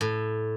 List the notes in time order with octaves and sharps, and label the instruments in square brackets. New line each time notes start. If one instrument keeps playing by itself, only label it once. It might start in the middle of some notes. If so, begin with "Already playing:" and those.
[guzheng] A2